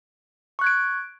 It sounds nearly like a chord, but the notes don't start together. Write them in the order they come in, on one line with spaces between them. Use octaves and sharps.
C#6 F#6 G#6 D7